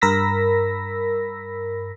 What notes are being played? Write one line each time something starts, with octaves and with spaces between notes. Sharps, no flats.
G2 A#4 B5 E6 A#6 B6